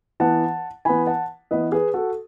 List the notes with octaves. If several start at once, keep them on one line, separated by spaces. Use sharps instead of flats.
E3 B3 F#5 A5
E3 B3 G#5 B5
F#5 A5
E3 B3 B4 D#5
G#4 B4
F#4 A4